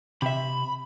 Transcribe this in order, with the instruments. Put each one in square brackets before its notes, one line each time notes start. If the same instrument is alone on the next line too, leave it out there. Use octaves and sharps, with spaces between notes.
[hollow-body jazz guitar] C3 E5 [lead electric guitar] B5